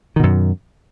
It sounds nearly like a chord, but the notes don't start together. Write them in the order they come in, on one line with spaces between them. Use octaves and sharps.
D#3 B2 F#2